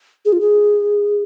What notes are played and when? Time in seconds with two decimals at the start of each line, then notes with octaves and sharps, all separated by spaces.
0.25 G#4
0.33 F4
0.41 G#4